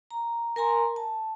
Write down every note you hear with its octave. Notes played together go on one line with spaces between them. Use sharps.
A#5
A#4 G#5 A#5 C6
A5